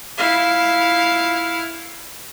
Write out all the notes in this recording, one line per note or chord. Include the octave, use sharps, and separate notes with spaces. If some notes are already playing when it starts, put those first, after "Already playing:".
E4 F5